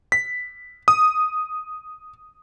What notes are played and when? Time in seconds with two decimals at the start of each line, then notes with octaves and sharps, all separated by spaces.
0.12 B6
0.88 D#6